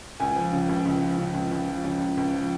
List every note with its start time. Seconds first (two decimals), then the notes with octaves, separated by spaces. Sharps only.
0.20 C#2 G#5
0.36 F3
0.52 C#3
0.69 C#2
0.85 C#2
1.02 F3
1.18 C#3
1.34 C#2
1.52 C#2
1.68 F3
1.84 C#3
2.01 C#2
2.17 C#2
2.34 F3